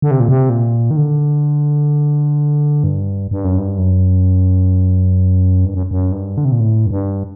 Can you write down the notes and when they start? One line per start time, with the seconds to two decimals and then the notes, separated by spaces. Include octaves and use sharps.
0.02 D3
0.11 C3
0.20 A#2
0.29 C3
0.49 A#2
0.91 D#3
0.97 D3
2.84 G2
3.31 G2
3.45 F#2
3.58 G2
3.78 F#2
5.65 G2
5.74 F#2
5.91 F#2
6.12 G2
6.37 D3
6.45 C3
6.52 A#2
6.60 A2
6.86 F#2
6.91 G2